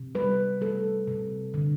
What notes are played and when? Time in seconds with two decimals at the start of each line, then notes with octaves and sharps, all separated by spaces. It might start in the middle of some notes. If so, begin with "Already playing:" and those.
Already playing: C3
0.15 G3 B4
0.61 G3 A4
1.07 C3
1.54 D3